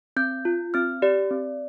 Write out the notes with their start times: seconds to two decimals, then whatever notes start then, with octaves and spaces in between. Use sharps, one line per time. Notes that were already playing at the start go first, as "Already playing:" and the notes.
0.16 C4 G6
0.45 F4
0.74 C4 F6
1.02 G4 D5
1.31 C4